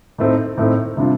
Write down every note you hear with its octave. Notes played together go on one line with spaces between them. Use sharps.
A2 A3 C4 D#4
A2 A3 C4 D#4
C3 G3 D4 F4